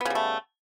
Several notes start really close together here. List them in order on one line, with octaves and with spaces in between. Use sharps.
B3 C#3 G3 A3